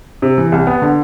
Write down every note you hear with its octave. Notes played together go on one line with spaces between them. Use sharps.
C3
E3
C2
B3
D3